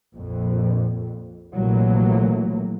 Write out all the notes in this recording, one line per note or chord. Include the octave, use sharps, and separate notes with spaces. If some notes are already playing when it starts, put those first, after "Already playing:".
A#1 F2
A#1 C3 E3 F#3 A3 A#3